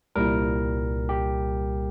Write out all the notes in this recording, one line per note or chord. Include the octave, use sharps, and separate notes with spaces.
C2 A#2 G3 A#4
G4